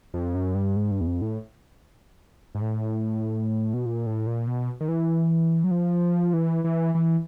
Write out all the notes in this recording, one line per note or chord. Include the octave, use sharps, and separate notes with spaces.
F2
F#2
G2
G#2
G2
E2
F2
A2
G#2
A2
B2
A#2
A2
A#2
B2
D#3
E3
F#3
F3
E3
E3
E3